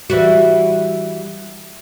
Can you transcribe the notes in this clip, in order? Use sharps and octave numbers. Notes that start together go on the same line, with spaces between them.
E3 G3 F#4